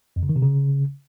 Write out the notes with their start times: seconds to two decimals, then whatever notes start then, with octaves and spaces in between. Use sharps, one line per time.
0.16 F2
0.23 C#3
0.29 D#3
0.36 C3
0.42 C#3